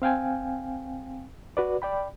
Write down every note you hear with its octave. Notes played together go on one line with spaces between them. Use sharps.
C4 F5 G5 G#5
F#4 B4 D5
D5 G5 B5